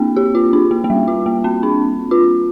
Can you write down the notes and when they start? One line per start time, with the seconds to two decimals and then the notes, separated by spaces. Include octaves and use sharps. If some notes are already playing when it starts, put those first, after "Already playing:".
Already playing: A#3 C4 D4
0.16 G4
0.35 F4
0.53 D4
0.71 A#3
0.84 A#3
0.90 G3
1.08 F4
1.26 A#3
1.44 C4
1.63 D4
2.11 F4